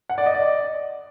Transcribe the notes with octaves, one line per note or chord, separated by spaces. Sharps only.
F#5
D5
D#5
D5